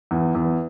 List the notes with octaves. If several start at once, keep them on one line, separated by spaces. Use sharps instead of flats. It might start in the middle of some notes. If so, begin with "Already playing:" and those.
E2
E2